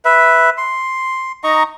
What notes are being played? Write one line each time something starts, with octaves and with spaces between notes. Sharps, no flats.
B4 E5
C6
D#4 D#5 A#5 C#6